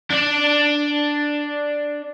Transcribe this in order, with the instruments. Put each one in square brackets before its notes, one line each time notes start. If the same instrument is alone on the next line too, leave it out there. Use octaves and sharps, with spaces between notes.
[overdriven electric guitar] D4 D5